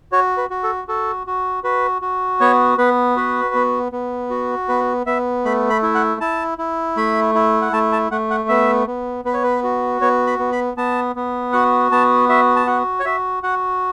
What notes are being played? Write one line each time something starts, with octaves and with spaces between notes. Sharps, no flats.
F#4 C#5
B4
F#4
A4
F#4 A4
F#4
F#4 B4
F#4
B3 C#5
B3 B4
F#4 B4
B3
B3
F#4
B3 B4
B3 E5
A3 B5
B5
E4
F#5
E4 A5
E4
A3 B5
E4
F#5
A3 A5
A5
A3 F#5
F#5
B3 E5
B3
B3 B4
C#5
B4
F#4
B3 C#5
B5
B3
B5
B3 A5
B3
F#4 F#5
B3 A5
F#4 E5
A5
F#4 F#5
C#5
F#4 E5
F#4 F#5